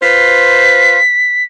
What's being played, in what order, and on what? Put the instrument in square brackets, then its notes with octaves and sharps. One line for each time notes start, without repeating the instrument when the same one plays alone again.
[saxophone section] F4 B4 C5 [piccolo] B6